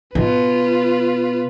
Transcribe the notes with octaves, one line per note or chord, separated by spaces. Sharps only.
B2 F4 B4